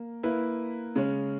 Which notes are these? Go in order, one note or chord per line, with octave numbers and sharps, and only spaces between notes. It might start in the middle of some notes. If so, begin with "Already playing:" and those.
Already playing: A#3
A#3 E4 B4
C#3 G#3 C#4